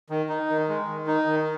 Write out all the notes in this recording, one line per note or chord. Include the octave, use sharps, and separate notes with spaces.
D#3
D#4
D#3
G#3
D#3
D#4
D#3